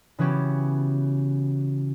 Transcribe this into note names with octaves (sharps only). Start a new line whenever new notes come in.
C#3 E3 B3 C#4 F#4 G4